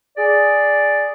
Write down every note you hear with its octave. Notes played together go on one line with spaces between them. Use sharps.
G#4 D5